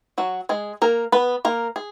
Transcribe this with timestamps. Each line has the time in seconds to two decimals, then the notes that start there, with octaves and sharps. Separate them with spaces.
0.18 F#3 F#4
0.49 G#3 G#4
0.82 A#3 A#4
1.12 B3 B4
1.45 A#3 A#4
1.76 G#4